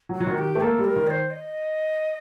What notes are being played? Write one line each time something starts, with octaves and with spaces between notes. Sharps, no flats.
F#3
F#4
F#3
D#3
G4
A3
A#3 A4
G3
A#4
D#3
D5
C5
D#5